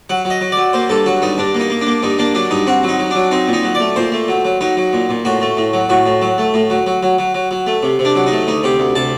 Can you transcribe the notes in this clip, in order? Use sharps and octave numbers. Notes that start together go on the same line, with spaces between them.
F#3 F#5
F#3
D#5
F#3
F#3 D5
A#3 C5
G2 A4
F#3 F#4
G2 D#4
G2 D4
A#3
D#4
A#3
D4
A#3
G2 D#4
A#3 D4
F#3 D4
G2 D#4
C4 F#4
F#3
D#4
F#3
F#3 D4
C4 D#4
A#2
D#4
F#3
D5
A3
A#2 C5
A3
F#3
F#3
F#3 D#4
F#3
A#2
A#2
A2 F#4
A3
A2
F#3
A2 F#4
A2
F#3
A3
A2
F#3
F#3
F#3
F#3
F#3
F#3
A3
C3
C3
D4
F#3
D#4
A3
D2 D#4
C3 G4
D2
C3 A5